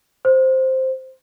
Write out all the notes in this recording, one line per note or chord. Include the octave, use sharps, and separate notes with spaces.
C5